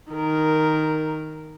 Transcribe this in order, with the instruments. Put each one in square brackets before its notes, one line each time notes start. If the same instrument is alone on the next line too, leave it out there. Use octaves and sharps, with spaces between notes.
[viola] D#3 A#4